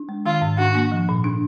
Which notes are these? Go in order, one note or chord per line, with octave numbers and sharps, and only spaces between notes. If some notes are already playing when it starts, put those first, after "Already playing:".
Already playing: D4
G#3
D#3 F4
G#2
D4 F#4
A#3
F3
A#2
D4